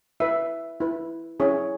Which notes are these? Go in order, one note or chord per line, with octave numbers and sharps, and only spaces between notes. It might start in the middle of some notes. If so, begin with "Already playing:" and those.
E4 B4 E5
E4 B4
C#4 E4 G#4 C#5